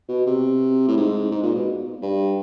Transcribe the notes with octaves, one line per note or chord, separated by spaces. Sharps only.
B2
C3
A2
G#2
G#2
A#2
B2
G2